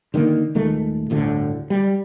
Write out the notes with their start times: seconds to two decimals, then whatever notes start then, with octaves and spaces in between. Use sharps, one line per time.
0.14 D3 D#3 G#3 A#3
0.55 D#1 D#3 G#3 A3
1.10 G1 D2 A2 D3
1.70 G3